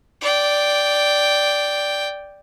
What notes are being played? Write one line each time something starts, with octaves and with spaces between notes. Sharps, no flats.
D5 G5